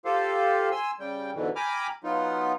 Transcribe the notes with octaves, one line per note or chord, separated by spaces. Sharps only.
F4 G4 A4 C5 F5
G#5 C6 E6
C#3 G3 G5
G#2 B2 D3 E3
G5 G#5 A#5 B5 D6 F6
F#3 B3 D#4 F4